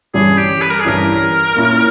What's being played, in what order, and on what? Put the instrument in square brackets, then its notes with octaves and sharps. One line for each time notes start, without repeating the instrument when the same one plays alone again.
[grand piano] G2 E3 G3 C#4 E4 [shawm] G#4
[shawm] G4
B4
A#4
G#4
[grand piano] G2 E3 G3 C#4 E4 [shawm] A#4
[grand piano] A#2 A#3 C#4 E4